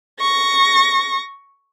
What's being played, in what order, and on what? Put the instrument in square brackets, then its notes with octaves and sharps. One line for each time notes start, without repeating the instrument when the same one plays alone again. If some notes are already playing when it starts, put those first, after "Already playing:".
[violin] C#6 A#6